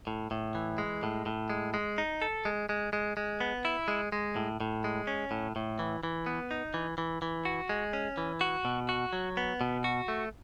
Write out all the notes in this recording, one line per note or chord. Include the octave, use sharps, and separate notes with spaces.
A2
A2
E3
G#3
A2
A2
G#3
G#3
D#4
A4
G#3
G#3
G#3
G#3
B3
E4
G#3
G#3
A2
A2
G#3
C#4
A2
A2
E3
E3
B3
D#4
E3
E3
E3
F#4
G#3
C#4
E3
F#4
B2
F#4
F#3
B3
B2
F#4
A3